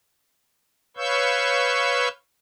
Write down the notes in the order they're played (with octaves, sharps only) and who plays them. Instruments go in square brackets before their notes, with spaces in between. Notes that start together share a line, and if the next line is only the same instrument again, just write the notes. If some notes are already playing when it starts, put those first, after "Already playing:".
[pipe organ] B4 C#5 F5 C#6 E6 G6